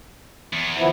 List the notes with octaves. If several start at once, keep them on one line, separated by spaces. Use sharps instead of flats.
E2
F3 B3 E4